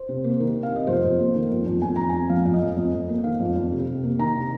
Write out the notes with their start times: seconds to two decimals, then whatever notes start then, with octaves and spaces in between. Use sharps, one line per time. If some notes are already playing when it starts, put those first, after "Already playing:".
Already playing: C5
0.09 C3
0.24 A#3
0.40 D#3 A#4
0.56 C3
0.63 F5
0.72 C3 D#5
0.87 F2 C5
1.04 F2
1.19 A#3
1.35 D#3
1.50 F2
1.66 F2
1.82 F2 G#5
1.96 F2 A#5
2.09 C4 G#5
2.30 F3 F5
2.45 F2 F5
2.54 D#5
2.61 F2
2.77 F2
2.93 F2
3.09 A#3
3.24 D#3 F5
3.40 F2
3.56 F2
3.72 C3
3.87 C3
4.04 A#3
4.19 D#3 A#5
4.35 C3